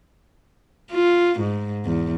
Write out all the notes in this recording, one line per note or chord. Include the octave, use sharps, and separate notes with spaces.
F4
G#2
E2